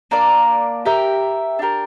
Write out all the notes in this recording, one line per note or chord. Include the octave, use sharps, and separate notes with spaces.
A#3 D4 A#4 D5
G4 A#4 E5
D4 G4 A#4